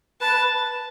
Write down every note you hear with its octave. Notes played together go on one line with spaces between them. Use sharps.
B4 A5
B4